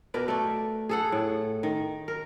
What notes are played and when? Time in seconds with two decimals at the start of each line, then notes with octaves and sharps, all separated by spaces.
0.14 B2 A#4 B4 D5
0.28 A3 D5
0.89 G#4 A4 F#5
1.12 A2
1.63 D#3
2.08 A#4